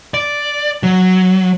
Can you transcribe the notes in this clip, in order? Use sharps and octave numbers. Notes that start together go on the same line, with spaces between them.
D5
F#3